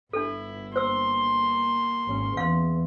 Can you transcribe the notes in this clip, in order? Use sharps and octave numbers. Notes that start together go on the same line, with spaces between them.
G1 D4 E4 A4
A#3 C5 C6 E6
G#1 C#4
E2 F5 C6